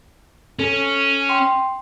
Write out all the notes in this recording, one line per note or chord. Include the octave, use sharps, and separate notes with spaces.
C#4 A4
G5 C6